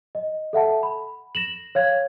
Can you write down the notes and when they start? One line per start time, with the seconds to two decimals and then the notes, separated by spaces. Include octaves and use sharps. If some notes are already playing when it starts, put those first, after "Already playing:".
0.15 D#5
0.53 A4 E5 F#5 A5
0.83 B5
1.35 A#6 E7 F#7
1.75 C#5 F5 G#6